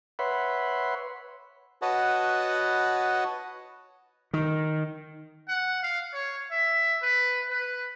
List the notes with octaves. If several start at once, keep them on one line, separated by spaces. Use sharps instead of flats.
B4 C#5 E5 F#5 B5 C6
F#4 B4 C#5 D#5 F#5 A5
D#3
F#5
F5
C#5
E5
B4
B4